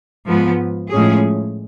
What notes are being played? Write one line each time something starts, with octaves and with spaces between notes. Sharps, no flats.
G#2 F3 B3
A2 F3 G#3 C#4 G#4